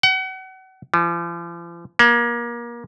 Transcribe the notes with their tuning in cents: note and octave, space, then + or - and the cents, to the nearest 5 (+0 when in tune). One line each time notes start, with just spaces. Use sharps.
F#5 +35
F3 -45
A#3 +30